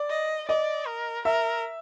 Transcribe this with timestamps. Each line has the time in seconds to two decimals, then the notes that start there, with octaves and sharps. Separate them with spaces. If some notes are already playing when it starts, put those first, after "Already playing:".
Already playing: D5
0.10 D#5
0.49 D5 D#5
0.87 A#4
1.25 A#4 E5